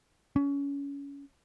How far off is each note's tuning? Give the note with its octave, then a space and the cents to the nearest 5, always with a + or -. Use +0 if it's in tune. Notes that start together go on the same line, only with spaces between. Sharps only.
C#4 +25